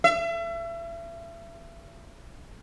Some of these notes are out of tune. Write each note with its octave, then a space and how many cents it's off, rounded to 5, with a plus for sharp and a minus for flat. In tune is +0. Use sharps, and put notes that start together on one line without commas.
E5 +35